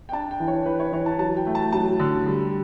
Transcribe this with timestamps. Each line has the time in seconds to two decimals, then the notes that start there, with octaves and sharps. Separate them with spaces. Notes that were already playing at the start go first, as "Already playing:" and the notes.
0.09 G5
0.12 D4 A5
0.31 G5
0.40 E3
0.48 C#5
0.66 E3 B4
0.80 C#5
0.92 E3 C#5
1.06 A5
1.19 F#3 A5
1.37 G5
1.47 A3
1.55 A5
1.72 F#3 A5
1.99 D3
2.26 G3